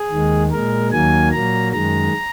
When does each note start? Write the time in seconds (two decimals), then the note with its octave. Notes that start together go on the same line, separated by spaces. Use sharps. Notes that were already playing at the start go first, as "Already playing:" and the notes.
Already playing: G#4
0.10 D#2 D#3 G#3
0.51 A#2 G#3 A#4
0.91 D#2 D#3 F#3 A#3 G#5
1.32 A#2 F#3 A#3 A#5
1.72 F#2 D#3 G#3 A#5